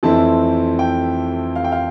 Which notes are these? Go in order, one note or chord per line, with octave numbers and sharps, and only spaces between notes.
F2 E3 A3 C4 E4 A5
G5
F5
G5
F5